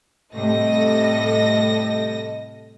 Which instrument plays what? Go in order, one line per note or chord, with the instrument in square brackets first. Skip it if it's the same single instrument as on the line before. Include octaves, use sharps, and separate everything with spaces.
[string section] A2 C3 G3 [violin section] A4 D#5 A#6